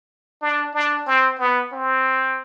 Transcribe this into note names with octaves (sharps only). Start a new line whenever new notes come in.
D4
D4
C4
B3
C4